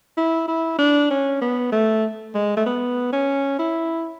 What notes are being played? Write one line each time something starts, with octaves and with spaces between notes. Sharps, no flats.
E4
E4
D4
C#4
B3
A3
G#3
A3
B3
C#4
E4